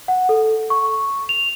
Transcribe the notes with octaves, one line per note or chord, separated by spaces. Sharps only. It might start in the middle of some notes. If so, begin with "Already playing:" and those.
F#5
A4
C#6
F7